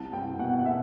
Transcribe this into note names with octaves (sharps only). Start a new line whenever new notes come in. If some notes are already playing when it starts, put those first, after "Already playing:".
Already playing: C2 A5
C2 G5
B2 F#5
F#5
B2 E5